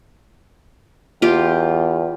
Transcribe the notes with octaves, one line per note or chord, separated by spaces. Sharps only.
E2 F4 G4